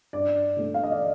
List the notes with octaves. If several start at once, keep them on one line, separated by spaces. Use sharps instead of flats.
G2 D5
D3 A3
F5
D#5
D5